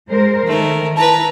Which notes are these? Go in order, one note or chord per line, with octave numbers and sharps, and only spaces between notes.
G#3 A#4 C5
D#3 A3 A#4
E4 B4 A5 A#5